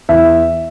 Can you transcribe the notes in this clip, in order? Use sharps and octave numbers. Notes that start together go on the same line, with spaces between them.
E2 E5